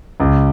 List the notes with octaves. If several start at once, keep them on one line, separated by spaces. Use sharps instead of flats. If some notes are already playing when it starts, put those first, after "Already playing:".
C#2